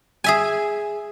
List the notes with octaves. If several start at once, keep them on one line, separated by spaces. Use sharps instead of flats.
G#4 E5 G#5